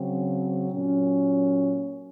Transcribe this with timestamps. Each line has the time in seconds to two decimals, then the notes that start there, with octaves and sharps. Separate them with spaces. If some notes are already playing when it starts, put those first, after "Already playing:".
Already playing: C#3 F#3 C4
0.72 A#2 F#3 C#4